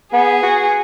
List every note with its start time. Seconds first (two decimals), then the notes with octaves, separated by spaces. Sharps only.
0.13 B3 G#4
0.43 F#4